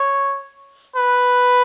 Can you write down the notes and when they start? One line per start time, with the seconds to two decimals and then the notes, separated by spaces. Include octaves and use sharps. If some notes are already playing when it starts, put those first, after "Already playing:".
Already playing: C#5
0.96 B4